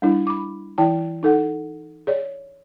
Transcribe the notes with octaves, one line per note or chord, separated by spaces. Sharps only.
G3 D4 E4
B5 D6
E3 E4 G5 A5
D#4 A4 F#5
G#4 C#5 D5